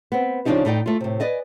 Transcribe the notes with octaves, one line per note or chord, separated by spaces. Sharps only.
B3 C4
C#3 F3 A#3 D4 D#4 G4
A2 D#4 D5 G5
A3 F4
A2 C3
B4 D5 D#5 G#5